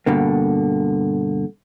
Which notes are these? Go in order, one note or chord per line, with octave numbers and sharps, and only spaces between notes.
G2 B2 D3 A#3